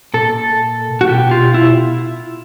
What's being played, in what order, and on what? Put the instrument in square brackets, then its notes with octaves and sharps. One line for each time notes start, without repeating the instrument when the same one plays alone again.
[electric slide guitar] A#2 A4
F#4
B2 G4
F4
E4